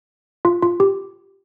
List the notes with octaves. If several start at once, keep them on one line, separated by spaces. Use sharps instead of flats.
F4
F4
G4